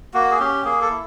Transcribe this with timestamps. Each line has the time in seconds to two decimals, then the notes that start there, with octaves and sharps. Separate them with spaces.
0.14 A#3 F#4
0.31 G#4
0.39 C#4 G4
0.65 A#3 G#4
0.81 A4
0.90 E4